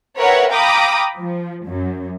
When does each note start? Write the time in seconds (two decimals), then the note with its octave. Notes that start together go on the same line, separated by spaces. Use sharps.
0.17 A#4 B4 C#5 E5 F#5 G5
0.51 F5 G5 A#5 B5 D6 D#6
1.15 F3
1.65 F#2